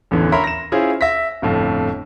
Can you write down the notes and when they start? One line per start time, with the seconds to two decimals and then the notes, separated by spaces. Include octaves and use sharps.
0.11 A1 E2 D3 E3
0.32 A#4 C#5 E5 B5 C6
0.44 A#6 E7
0.72 C#4 E4 F4 G#4 C5
1.01 E5 A#6 B6
1.42 G1 F2 A2